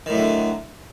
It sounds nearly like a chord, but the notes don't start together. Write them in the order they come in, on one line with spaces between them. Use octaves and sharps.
D#3 A2 F#3 D3